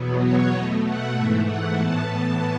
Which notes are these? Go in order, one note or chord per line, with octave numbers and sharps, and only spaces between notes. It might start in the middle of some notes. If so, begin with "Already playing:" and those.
Already playing: E2 B2 F#3 B3
C#5
B2 A3 D#5
F#5
G#2 E3 A3 E5
F#5
A2 E3 B3 A5